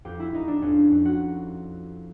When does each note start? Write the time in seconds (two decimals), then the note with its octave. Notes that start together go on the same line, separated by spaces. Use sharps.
0.05 F2 G4
0.20 E4
0.33 F2 D#4
0.48 D4
0.62 F2 C#4
0.91 F2
1.05 F#4